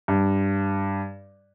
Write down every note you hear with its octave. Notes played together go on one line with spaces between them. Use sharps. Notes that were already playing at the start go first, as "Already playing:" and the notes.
G2